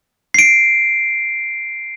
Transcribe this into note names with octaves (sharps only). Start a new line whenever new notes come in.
C7 D7